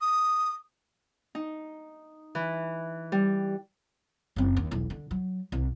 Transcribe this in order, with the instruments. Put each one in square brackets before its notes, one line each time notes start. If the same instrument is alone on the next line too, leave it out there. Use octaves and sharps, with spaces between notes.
[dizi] D#6
[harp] D#4
E3
G3
[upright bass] F#1 C4
D#2
E1 B1
D3
F#3
C2